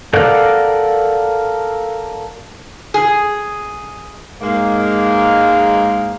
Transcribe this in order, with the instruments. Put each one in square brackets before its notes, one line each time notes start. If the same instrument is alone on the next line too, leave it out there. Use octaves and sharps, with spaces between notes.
[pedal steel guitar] A4 A#4 D5 F5 F#5
[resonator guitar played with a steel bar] G#4
[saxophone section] G#2 G#3 A#3